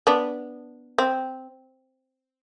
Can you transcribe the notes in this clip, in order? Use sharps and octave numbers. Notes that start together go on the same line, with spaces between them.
B3 D4
C4